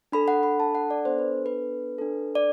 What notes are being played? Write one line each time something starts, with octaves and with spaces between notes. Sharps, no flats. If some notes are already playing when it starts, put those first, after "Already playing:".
D4 A4 B5
F#5
B5
A5
F#5
D5
B3 D4 A4 C5
B4
B4
D4 A4
D5